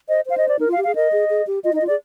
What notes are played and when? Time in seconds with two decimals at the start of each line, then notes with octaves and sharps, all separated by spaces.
0.09 C5 D#5
0.26 C5 F5
0.38 D#5
0.49 D5
0.59 D#4 A#4
0.68 F4
0.72 F5
0.78 G4
0.84 G#4 F5
0.95 A#4 D#5
1.12 G#4
1.30 G#4
1.47 G4
1.64 F4 D#5
1.73 D#4
1.76 D#5
1.82 F4
1.87 G#4 D5